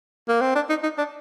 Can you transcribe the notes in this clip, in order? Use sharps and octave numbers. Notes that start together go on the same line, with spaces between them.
A#3
C4
D4
D#4
D#4
D4